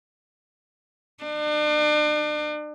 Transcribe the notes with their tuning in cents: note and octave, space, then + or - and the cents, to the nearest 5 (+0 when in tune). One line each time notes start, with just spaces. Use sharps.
D4 +40